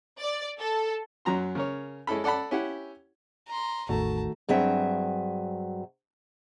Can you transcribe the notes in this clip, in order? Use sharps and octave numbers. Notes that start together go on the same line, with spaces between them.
D5
A4
F#2 F#3 A#5 C6
C#3 A#4 C#5
G#3 C#4 E4 A4 B5
A4 D5 F#5 A5 B5
C#4 E4 G4 F#5
A#5 C6
A1 E2 D#3 A3 F#4 A5 A#5
G2 F#3 C4 G#4 E5